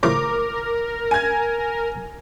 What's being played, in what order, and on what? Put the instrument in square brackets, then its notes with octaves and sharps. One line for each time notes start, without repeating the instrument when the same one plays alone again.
[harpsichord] A2 C#3 F3 [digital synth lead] A#4 [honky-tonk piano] D6
[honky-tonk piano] G#5 G#6